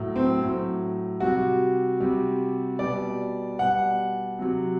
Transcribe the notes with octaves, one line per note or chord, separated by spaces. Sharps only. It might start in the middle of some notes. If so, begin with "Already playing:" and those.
Already playing: A2 F#3
C4
A2 F#3
C3 G3 F#4
C3 G3
B2 G3 D5
B2 G3 F#5
C3 F#3